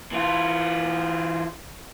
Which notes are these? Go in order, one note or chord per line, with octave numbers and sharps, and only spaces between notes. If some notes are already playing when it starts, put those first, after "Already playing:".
E3 F4